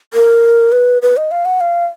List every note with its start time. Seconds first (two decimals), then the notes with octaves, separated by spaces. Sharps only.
0.14 A#4
0.72 B4
1.02 B4
1.17 D#5
1.31 F5
1.45 F#5
1.61 F5